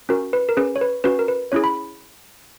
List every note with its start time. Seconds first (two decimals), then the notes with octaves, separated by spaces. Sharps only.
0.09 C#4 F#4 A#4
0.33 B4
0.49 A#4
0.57 C#4 G#4 B4
0.76 C#5
0.81 B4
1.04 C#4 F#4 B4
1.19 A#4
1.28 B4
1.52 C#4 E4 G#4 C#5
1.64 B5